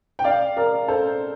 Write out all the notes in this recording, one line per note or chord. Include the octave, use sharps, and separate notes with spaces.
G5
D5 F5
A#4 D5
A4 C5